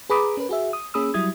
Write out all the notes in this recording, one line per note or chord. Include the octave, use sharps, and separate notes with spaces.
G#4 B4 A#5 B5 D6 D#6
C#4 A#4 B4
F#4 G#4 E5
D#6
A#3 C#4 G#4 B5 D#6 E6
F#3 G3 E4 D#6 G#6